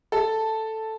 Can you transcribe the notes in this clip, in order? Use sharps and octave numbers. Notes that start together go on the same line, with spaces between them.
A4